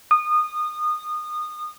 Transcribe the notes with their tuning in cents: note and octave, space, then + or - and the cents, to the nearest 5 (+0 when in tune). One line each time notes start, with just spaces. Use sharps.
D#6 -25